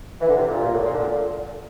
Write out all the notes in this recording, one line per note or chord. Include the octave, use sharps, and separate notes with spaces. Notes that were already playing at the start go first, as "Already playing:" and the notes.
E3
D3
C3
A#2
A#2
A2
A#2
D3
A#2